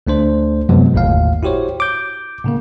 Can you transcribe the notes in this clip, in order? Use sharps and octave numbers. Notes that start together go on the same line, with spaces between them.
D2 A3 D4 C5
F#2 C3 F3 F#3 G#3 B3
G1 D#2 A2 F5
E4 F#4 G4 C5 C#5
D6 G6
A2 C#3 A#3